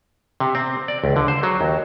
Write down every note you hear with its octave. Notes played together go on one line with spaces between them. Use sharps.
C3
C4
D5
C#2
D3
C5
F#3
D#2